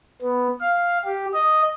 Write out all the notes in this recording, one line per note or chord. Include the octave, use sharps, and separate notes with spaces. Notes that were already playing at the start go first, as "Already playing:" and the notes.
B3
F5
G4
D#5